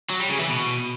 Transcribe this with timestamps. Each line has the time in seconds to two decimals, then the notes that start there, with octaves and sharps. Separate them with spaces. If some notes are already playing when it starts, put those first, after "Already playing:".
0.10 F#3
0.19 G3
0.29 C#3
0.39 E3
0.49 B2